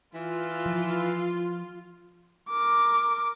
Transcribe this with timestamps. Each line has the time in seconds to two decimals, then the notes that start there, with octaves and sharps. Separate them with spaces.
0.14 E3 F4
0.66 F3
2.50 A#4 D6